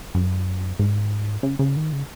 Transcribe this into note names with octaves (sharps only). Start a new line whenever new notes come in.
F#2
G#2
C#3
C#3
D#3
C#3